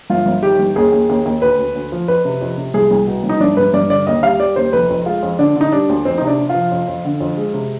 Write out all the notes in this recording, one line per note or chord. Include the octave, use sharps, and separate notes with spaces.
G1 F4
G1
D#3 G4
G1
D#2 G#4
D#2
D#2
D#2
D2 B4
D2
D2
F3
F2 B4
C3
F2
C3
C2 G#4
C2
B2
C2
D#4
G1 D4
G2 B4
G2 D5
D3 D5
D#2 D#5
G3 F5
G3 D5
D#2 C5
F1 B4
F2
G#3 F4
F2
D3 D4
D3
D#4
G3 D4
D2
F2 C4
C3 D#4
D4
C3
F4
F3
F2
F2
D3
F2
G#3
C3